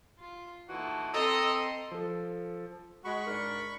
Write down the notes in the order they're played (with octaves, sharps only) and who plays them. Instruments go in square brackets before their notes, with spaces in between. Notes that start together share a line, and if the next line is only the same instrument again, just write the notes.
[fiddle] F4
[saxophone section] A#2 E3 F#4 [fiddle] A3 D#4
[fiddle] C4 C6 [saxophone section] A4 [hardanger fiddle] D#5 [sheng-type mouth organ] A#5 D#6 E6
[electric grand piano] F3 A4
[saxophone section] G#3 F#4 [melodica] B5 C#6
[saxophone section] G#2 D4 A#4